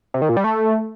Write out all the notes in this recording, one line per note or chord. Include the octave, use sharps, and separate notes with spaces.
C3
D#3
A#2
G3
A3